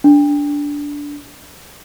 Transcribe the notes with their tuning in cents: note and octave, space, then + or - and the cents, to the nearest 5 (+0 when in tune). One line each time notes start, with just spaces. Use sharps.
D4 -15